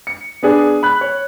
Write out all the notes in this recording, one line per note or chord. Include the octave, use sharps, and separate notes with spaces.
C#7
B3 D4 G#4
B5 F#6
C#5